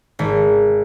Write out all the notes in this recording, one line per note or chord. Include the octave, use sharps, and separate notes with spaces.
G#1